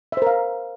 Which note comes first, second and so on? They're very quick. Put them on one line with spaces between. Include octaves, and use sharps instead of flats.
E5 C5 A#4 F5